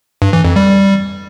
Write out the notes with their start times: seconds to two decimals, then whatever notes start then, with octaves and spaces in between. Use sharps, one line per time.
0.22 G2
0.33 E3
0.45 F2
0.56 G3